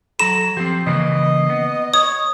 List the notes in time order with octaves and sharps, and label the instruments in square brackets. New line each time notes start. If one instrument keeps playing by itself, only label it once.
[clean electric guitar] F#3 A#5 [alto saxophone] A4 [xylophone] E7
[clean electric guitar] F3 C4 [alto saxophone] G4
[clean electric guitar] C#3 E3 A#3 [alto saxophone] D#5
[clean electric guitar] B3
[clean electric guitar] C#5 [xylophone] D#6